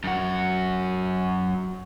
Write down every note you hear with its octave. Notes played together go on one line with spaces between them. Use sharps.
F#2 F#4